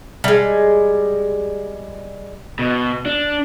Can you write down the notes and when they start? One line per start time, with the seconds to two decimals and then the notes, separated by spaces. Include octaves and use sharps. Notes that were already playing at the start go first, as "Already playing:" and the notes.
0.24 G3 G#3
2.59 B2
3.06 D4